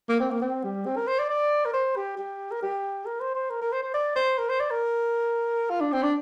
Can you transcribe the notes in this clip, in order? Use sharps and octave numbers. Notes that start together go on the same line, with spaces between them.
A#3
C4
A#3
C4
G3
C4
A#4
C5
D5
D5
A#4
C5
G4
G4
A#4
G4
A#4
C5
C5
A#4
A#4
C5
C5
D5
C5
A#4
C5
D5
A#4
F4
D4
C4
D4